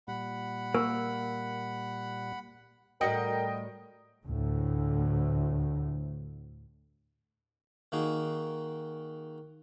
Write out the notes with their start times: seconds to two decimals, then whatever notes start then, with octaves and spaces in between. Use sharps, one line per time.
0.08 A#2 G3 F#5 B5
0.75 A#3 A#4
3.01 A2 G3 F#4 A#4 D#5 G5
4.25 D2 A2
7.92 D#3 A#3 D#4 F#4 G#4